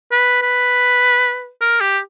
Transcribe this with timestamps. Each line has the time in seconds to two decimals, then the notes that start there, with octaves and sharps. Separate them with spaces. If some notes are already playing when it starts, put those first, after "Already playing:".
0.11 B4
0.42 B4
1.61 A#4
1.81 G4